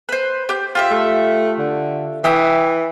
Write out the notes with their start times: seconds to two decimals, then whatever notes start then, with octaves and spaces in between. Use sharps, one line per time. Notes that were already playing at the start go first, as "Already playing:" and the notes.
0.09 B4 C5
0.49 G4 G6
0.75 F4 G4 E5
0.91 A3
1.59 D3
2.24 E3 E5 G5 D#6